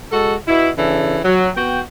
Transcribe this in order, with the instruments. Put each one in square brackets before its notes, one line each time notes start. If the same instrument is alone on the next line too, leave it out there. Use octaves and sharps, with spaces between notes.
[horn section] G#3 F#4 A4
B2 E4
C#3 E3 D4 A4
F#3
B3 F#4 G5